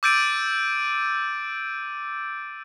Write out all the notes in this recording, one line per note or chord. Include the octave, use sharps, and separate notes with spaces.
D6 E6 G6 A6 D7 D#7